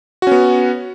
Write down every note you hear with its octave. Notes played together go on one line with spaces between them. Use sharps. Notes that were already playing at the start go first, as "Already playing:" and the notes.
B3 C#4 F#4